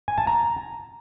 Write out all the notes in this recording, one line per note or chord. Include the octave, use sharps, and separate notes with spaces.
G#5
A5
A#5